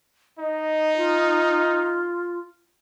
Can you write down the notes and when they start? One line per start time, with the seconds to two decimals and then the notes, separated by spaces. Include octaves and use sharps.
0.39 D#4 D#5
0.97 F4